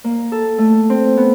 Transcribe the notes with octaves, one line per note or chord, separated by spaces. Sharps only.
A#3
A4
A3
C4
B3